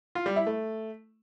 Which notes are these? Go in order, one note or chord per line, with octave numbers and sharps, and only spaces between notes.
F4
G3
E4
A3